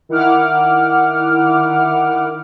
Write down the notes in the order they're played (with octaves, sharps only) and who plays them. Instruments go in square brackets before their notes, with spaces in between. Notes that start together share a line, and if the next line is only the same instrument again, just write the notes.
[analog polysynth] D#3 E4 F#5 D6 F6